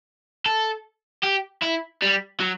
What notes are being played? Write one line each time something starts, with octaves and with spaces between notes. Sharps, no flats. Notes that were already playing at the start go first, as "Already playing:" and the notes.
A4
G4
E4
G3
F#3